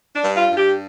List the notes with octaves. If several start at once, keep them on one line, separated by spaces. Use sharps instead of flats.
D4
G2
F4
G2
G4